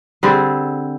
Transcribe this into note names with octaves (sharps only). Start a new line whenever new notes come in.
D3 G3 C4 G#4